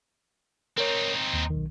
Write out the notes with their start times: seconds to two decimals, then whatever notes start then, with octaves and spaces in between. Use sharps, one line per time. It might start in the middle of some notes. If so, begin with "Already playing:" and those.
0.78 C4 D#4 A#4 C#5
1.33 D#2
1.50 B1 D#3